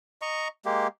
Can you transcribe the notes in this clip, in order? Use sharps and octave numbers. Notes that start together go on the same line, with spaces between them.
D#5 A#5 C#6
G#3 A#3 G4